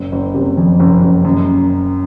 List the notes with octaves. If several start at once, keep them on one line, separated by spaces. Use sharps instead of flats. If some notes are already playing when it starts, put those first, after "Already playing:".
Already playing: F#1
F#1
C3
F2
F#1
F#1
F#2